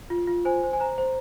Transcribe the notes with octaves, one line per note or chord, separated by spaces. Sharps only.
F4
F4
C5 G#5
C5
G#5
C5 A#5
C5